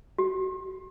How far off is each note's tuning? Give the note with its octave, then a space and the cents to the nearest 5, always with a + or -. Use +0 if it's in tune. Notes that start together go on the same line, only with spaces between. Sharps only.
F#4 +35